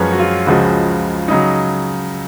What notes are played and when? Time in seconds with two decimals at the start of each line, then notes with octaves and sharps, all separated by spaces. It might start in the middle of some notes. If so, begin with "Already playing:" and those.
Already playing: F#2 F3 G#3 C#4 B4 C#5
0.12 F#4
0.19 F4
0.46 C#2 C#3 F3 G#3 F#4
1.28 C#3 F#3 D#4